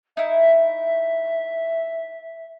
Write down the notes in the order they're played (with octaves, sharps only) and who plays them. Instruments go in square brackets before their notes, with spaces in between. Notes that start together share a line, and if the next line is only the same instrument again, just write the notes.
[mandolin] D#4 E4 [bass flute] E5